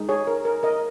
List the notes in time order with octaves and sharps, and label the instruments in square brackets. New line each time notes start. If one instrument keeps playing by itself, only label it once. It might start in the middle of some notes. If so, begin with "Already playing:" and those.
Already playing: [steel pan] G#3 D#4
G#4 C#5
A#4
A#4
A#4 D#5